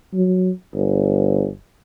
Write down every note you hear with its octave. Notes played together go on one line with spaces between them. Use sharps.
F#3
G1